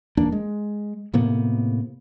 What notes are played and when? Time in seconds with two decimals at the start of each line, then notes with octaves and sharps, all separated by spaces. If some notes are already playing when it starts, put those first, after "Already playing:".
0.17 D#1 E2 A#3 D4
0.32 G#3
1.14 A2 C3 A#3 B3